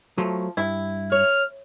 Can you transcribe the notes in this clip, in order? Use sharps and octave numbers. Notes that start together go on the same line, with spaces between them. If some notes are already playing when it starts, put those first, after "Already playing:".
F3 F#3 A3
G2 E4
C#5 F6